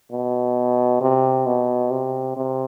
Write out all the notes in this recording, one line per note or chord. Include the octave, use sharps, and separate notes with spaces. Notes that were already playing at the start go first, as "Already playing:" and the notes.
B2
C3
B2
C3
C3